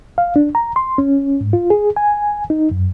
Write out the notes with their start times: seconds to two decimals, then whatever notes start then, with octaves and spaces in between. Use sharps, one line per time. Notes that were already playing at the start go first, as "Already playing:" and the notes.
0.18 F5
0.36 D4
0.55 A#5
0.76 C6
0.98 C#4
1.41 G#2
1.53 F4
1.70 G#4
1.96 G#5
2.50 D#4
2.71 F#2